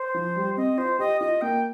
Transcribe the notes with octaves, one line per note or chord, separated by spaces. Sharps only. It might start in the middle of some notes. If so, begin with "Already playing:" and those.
Already playing: C5
F3
G3
C4 D#5
F4 C5
G4 D#5
F4 D#5
A#3 G5